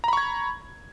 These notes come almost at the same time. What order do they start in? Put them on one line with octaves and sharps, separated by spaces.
A#5 B5 C#6 G#6